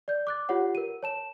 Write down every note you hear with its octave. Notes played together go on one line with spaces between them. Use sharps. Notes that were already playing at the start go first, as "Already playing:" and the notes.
D5 G6
D6 F#6 A6
F4 G4 C#5 F#5
A#4 D#7
C#5 A5 E7